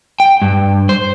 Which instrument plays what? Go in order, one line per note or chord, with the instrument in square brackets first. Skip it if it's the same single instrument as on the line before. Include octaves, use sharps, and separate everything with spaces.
[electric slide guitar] G5
G2
C5